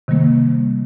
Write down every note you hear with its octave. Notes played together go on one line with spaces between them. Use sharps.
C3 D#3 G3 A#3